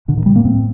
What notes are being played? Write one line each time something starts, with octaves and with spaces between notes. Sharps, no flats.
A2 D3
D#3
A2 G3
A#3
A2 C4